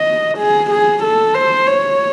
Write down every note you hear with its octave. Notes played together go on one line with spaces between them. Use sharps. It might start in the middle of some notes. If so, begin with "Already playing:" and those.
Already playing: D#5
G#4
G#4
A4
C5
C#5